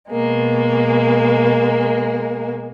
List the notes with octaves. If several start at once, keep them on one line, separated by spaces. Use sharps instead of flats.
B2 G#3 A#3